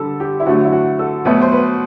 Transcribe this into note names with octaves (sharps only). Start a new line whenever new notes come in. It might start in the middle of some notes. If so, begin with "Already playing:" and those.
Already playing: D3 G3 A4
G4
E4
D3 F#3 A3 F#4
E4
F#4
A4
B2 F#3 A3 B4
C5
B4